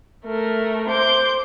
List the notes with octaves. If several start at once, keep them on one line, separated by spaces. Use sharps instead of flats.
A3 A#4
C5 D6 G6